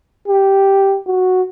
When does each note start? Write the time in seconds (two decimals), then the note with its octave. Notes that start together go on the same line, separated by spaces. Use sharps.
0.28 G4
1.07 F#4